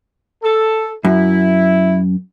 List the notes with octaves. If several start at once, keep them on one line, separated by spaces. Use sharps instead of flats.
A4
F#2 E4